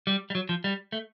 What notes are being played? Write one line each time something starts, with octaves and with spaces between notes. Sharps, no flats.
G3
G3
F#3
F3
G3
A3